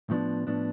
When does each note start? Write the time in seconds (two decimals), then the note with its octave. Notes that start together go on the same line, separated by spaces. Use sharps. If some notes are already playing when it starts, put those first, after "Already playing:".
0.10 A2 F3 B3 D4
0.47 A2 F3 B3 D4